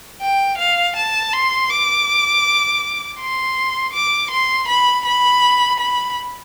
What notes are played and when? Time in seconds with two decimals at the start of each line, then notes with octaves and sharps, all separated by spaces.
0.21 G5
0.58 F5
0.96 A5
1.33 C6
1.70 D6
3.20 C6
3.94 D6
4.31 C6
4.68 B5
5.05 B5
5.80 B5